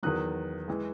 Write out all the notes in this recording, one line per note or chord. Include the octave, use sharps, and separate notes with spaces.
E2 D#3 F#3 D#6 F#6
E3 G#3